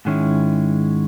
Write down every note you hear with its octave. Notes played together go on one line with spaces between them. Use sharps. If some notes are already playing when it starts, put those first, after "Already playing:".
G#2 D#3 G#3 C#4 E4